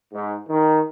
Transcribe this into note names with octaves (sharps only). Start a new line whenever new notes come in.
G#2
D#3